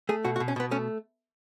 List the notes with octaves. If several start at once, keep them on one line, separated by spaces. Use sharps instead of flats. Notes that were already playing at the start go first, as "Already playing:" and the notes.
A3 G#4
B2 F#4
F#4
B2
C#4
B2 B3
A3 C#4